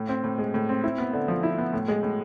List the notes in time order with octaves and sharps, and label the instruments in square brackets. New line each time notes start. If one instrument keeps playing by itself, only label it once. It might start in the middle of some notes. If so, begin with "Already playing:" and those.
Already playing: [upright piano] A2
C4
A2
G#3
A2
C4
E4
B3
D3
F3
E4
B3
A2
G#3
A2